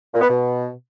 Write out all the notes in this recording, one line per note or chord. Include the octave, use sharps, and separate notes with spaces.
A#2
B3
B2